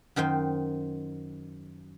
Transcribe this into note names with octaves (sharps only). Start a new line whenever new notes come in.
F#2 D#3 C5 G5